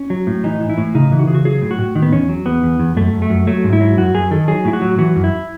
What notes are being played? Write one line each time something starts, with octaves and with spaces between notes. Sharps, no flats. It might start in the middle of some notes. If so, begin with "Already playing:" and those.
Already playing: C#4
F#3
A2
E3 D#4
E3
E4
A2
C#3 D#4
E3
F#4
C#3 G#4
F#4
F#3 G#4
A2
F#4
A2
D#3
B3
E2 C#4
F#3
E2 B3
E2
E2
F#2 A3
F#2
A3
F#2
F#3 A3
G#2
E4
F#3
F#2 F#4
F#2 G#4
D#3 A4
F#3 G#4
A2 E4
F#4
F#3
E3 F#4
F#2
E4